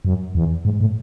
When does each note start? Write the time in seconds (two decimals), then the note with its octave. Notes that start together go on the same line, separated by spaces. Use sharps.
0.05 F#2
0.35 E2
0.65 G#2
0.81 A2